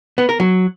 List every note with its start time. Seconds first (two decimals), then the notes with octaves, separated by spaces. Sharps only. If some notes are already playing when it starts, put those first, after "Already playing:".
0.18 B3
0.29 A#4
0.40 F#3